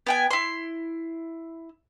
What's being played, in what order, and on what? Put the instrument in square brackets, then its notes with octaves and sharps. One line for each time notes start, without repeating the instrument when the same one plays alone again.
[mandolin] B3 G5 G#5
E4 C6